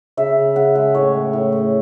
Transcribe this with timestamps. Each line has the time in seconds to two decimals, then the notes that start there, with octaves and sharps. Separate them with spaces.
0.17 C#3 E5
0.37 C#3
0.56 C#3 F#5
0.75 G#3 E5
0.94 A2 C#5
1.14 A2
1.33 A2
1.52 A2